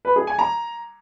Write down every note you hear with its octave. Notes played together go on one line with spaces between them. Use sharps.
B4
G#4
G#5
A#5